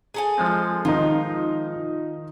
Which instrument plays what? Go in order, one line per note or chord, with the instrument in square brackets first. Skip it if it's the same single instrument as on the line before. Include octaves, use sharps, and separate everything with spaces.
[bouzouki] G#4 A4 G#5
[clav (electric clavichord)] F3 G#3 C4
[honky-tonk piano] D#3 D#4 [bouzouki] F4